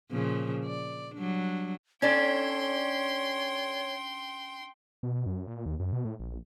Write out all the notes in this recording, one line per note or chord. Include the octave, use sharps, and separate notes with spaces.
A#2 C#3 F3
D5
F#3 G3 D4
C#4 D4 A4 C#5 D5 G5 G#5 C6
B2
F#2
A#2
D#2
F#2
B2
A2
A#1